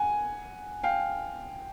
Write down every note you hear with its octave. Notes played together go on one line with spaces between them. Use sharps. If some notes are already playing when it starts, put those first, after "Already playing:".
Already playing: F#5 G#5
F5 G5